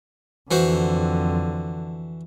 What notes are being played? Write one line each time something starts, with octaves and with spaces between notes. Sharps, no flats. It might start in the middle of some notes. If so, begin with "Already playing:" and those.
F2 D3 E3 F#4 C5